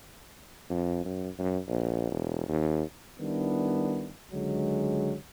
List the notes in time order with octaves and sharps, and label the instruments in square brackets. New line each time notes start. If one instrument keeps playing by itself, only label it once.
[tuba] F2
F#2
F#2
A#1
E1
D#2
[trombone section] D#3 G3 B3 D4 E4
C#2 D3 F#3 G#3